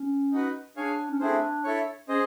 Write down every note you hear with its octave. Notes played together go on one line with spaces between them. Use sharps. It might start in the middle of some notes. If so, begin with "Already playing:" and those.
Already playing: C#4
D#4 F#4 B4
D4 G#4 C#5 F5 G#5
C#4
A3 C4 D4 E4 G#4 C5
E4 A4 C#5
C#4 G#4 C5 D#5